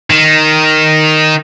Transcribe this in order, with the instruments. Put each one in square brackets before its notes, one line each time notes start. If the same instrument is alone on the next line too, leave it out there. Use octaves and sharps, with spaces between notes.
[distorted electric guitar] D#3